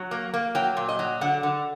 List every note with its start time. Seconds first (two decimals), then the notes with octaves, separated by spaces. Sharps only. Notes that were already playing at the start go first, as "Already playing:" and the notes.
Already playing: F#3
0.11 A#3
0.34 A#3
0.55 F#3 G5
0.77 A#2
0.89 D#5
0.99 F#3
1.21 D3 F#5
1.43 D3